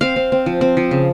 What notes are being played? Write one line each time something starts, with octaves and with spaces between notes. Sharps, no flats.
C4 F5
C4
C4
F3
C4
F3
C#3